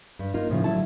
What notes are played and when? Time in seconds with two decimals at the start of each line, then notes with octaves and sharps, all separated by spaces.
0.19 G2
0.34 A#3 D#4 F4
0.50 A2 C#3 F3
0.64 D3 F#3 E4 A5